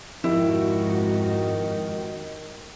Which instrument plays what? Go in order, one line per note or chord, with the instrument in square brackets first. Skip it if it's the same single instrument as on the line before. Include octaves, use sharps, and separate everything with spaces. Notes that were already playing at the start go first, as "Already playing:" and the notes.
[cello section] F2 G#2 F#4 [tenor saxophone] D#3 [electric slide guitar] F3 G4 [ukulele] E4